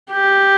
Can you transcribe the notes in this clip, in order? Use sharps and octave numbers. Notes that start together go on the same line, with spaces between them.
G4